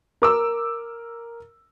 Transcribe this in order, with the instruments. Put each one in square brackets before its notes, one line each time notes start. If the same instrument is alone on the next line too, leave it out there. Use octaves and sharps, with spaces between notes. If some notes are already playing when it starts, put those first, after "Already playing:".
[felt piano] A#4 D6 E6